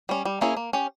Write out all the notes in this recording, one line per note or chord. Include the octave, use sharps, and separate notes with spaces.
G3 C#4
G3
A#3 C#4 E4 G#4
A#3
C#4 G4